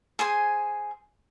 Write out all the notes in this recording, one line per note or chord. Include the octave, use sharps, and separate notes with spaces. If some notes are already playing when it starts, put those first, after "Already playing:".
G#4 C5 G#5